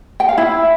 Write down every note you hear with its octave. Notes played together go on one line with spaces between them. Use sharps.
G5
F5
E4